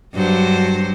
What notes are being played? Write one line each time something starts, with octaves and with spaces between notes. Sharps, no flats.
G2 F#3 C5